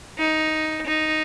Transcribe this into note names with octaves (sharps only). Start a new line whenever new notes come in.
D#4
D#4